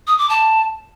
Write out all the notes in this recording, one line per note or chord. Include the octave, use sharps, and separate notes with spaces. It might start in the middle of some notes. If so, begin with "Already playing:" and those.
D#6
D6
A5